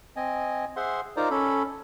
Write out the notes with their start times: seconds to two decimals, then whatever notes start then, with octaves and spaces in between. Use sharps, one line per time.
0.16 C4 D#5 G#5
0.76 G#4 C5 E5 F#5 C6
1.17 D#4 F4 A#4 C5 D5 A#5
1.31 C#4 A4 B5